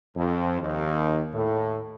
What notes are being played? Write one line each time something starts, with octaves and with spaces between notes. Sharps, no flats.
F2
D#2
A2